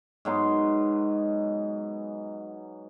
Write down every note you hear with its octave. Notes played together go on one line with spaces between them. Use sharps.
G#2 F#3 B3 C6